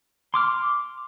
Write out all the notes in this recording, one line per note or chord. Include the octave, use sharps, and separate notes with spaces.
C6 D6 F6